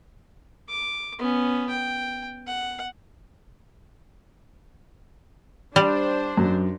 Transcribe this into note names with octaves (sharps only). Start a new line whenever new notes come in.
D6
B3 C#4
G5
F#5
G3 D4 C5
F#2